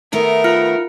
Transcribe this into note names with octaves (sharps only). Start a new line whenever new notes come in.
D#3 A3 B3 A#4
F4 F6 C#7